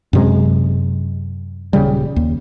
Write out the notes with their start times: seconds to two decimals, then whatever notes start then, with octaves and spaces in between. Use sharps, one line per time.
0.13 F#2 C3 G#3
1.73 D#1 C#3 G3
2.16 D#2